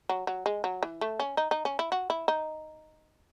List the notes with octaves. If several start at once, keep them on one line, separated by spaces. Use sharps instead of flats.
F#3
F#3
G#3
F#3
E3
A3
C#4
D#4
D#4
C#4
E4
F#4
E4
D#4